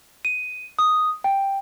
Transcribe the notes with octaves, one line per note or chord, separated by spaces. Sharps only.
D#7
D#6
G5